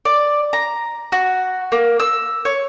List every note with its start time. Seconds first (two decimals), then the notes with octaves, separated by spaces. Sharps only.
0.05 D5
0.53 A#5
1.12 F#4
1.72 A#3
2.00 E6
2.45 C#5